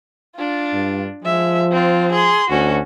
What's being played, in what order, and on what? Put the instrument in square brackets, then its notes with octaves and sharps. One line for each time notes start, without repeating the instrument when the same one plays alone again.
[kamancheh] D4 F4
[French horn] G2
[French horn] F3 [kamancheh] G#3 E5
[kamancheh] C4 F4
G#4 C6
[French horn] D2 [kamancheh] C#4 F#4